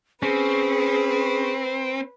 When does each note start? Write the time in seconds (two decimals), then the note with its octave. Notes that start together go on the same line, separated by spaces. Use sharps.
0.23 C4 C#4 G#4 B4